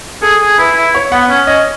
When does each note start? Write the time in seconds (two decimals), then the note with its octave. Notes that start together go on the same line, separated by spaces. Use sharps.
0.22 G#4 A4
0.41 G#4
0.58 E4 B4
0.76 E4
0.94 C#5
1.12 B3 F#5
1.30 C#4
1.47 C#4 D#5